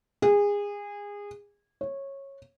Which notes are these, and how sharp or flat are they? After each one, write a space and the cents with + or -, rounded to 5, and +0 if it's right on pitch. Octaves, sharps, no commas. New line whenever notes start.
G#4 -25
C#5 -15